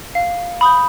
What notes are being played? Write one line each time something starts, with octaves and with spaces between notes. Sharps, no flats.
F5
B5 D#6 G6